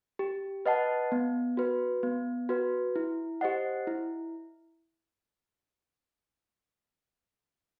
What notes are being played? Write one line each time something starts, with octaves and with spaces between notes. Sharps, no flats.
G4
B4 D#5 F#5 A5
B3
F#4 B4
B3
F#4 B4
E4
G4 C5 D#5 F#5
E4